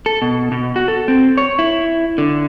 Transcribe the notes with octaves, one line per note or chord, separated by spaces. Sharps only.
A4
B2
B2
F#4
A4
C4
C#5
E4
D3